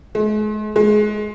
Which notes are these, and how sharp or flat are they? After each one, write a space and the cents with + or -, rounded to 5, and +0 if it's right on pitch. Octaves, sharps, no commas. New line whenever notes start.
G#3 +40
G#3 +20